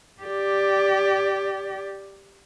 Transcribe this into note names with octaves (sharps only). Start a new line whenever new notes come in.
G4 D5